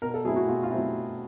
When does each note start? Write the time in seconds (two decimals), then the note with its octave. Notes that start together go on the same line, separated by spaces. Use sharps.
0.02 B2 A#4
0.14 A4
0.24 F#3 A3 C4 E4 G#4
0.36 F#4
0.48 B2 F4
0.63 F4
0.70 F#3 A3 C4 E4